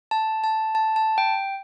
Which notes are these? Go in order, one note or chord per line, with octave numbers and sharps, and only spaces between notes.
A5
A5
A5
A5
G5